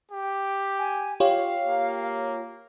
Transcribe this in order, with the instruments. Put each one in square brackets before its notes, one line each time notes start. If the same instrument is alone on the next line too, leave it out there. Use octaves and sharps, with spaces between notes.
[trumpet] G4
[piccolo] G#5
[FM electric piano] F4 G4 C#5 [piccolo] F5
[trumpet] A#3